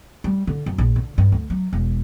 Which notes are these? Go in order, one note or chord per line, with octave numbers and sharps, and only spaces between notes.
G3
D3
F#2
A#1
D3
G2
D2
F#3
E1